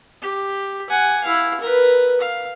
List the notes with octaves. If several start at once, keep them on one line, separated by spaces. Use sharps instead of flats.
G4
F#5 G#5
E4 F5
A#4 B4
F5